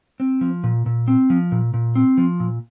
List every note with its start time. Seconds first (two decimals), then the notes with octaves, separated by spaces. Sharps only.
0.20 C4
0.41 F3
0.64 A#2
0.86 A#2
1.08 C4
1.30 F3
1.52 A#2
1.74 A#2
1.96 C4
2.18 F3
2.40 A#2